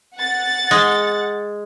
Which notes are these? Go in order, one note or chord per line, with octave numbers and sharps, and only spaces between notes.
F#5 A6
G#3